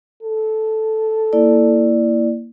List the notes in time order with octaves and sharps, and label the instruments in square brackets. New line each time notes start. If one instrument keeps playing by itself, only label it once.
[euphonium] A4
[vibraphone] A#3 E4 D5